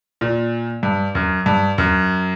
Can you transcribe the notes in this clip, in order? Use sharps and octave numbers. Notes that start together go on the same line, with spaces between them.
A#2
G2
F#2
G2
F#2